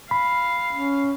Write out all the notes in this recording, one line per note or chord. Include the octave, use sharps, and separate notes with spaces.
F5 B5
C#4